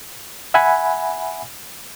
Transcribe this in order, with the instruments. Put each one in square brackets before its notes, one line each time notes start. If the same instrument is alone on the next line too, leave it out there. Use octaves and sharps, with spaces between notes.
[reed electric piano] E5 F#5 G#5 B5